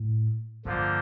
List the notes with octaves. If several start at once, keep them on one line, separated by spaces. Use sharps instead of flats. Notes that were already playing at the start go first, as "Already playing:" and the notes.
Already playing: A2
G2 D3 F3 A#3 F4 C5